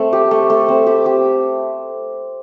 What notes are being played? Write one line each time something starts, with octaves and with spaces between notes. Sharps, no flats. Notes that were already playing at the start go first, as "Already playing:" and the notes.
Already playing: A3 C4
G4
A3
A3
C4
G4
G4